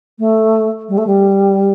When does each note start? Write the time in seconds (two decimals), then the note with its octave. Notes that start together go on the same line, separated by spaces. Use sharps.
0.19 A3
0.88 G3
0.97 A3
1.06 G3